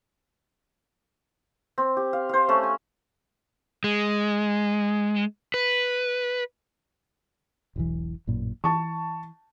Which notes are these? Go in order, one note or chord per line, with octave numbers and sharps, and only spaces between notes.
C4
G4
F5
C5 F5
A3 C#4 A5
G#5
G#3
B4
E1 B1 E3
A1 F#2 A#2
E3 A5 C#6